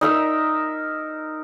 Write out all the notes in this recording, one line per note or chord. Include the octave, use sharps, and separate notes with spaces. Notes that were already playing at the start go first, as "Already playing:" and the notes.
D#4 A#4 E5